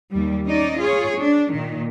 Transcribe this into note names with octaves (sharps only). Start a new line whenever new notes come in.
D#2 G3
C#4 D#4 D5 D#5
F4 G#4 C#5
D4
A#2 D#3